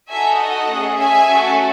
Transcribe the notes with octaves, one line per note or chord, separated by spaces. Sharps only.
D#4 F#4 A4 E5 G#5
D#5 F#5
A3 C#4 G#4
E5 G#5
A3 C#4 F#4 A4